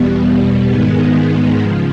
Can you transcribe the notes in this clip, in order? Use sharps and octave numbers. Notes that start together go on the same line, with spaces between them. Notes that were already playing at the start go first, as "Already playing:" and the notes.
Already playing: E2 B2 G3 B3
G#2 D#3 G#3 B3
C#3 F3